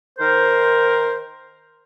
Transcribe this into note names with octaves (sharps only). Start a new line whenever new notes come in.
D#3 A#4 C5